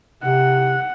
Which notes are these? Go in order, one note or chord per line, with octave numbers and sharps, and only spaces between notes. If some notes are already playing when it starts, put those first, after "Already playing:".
C3 F#5